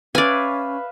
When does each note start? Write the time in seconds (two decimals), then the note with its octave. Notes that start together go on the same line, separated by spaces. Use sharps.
0.15 C#4 B4 D5 E5 F5 G#5